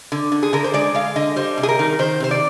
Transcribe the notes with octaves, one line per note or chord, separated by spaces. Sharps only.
D3
D3
G#4
D3 A#4
C5
G#3 D5
G#3 F5
D3 D#5
G3 C5
C3
G#4
A#4
D#3
D#3 C5
C3 C5
D5